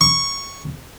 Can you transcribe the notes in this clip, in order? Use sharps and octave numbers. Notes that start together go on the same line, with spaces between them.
C#6